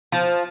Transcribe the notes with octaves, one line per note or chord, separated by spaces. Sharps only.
F3